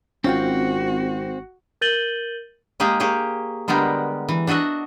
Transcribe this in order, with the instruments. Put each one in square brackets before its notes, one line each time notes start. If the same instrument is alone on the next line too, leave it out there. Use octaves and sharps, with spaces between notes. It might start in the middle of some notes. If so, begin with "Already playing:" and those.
[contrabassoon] G#1 [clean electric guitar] C4 [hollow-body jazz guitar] C#4 F4 G5 [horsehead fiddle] F#4
[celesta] A#4 G6 A6 D#7 F#7 G7
[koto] G#3 A#3 G4 G#4
A#3 G4 G#4 C#5
D3 G3 G#3 B3 G4 A#4
E3
D4 F#4 D#5 E5 F#5